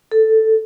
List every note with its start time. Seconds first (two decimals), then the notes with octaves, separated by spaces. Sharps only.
0.12 A4